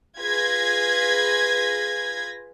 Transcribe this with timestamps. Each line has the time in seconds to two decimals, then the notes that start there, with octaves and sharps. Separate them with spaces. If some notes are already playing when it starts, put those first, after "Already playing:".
0.19 F4 G#4 B4 G#6 A#6 B6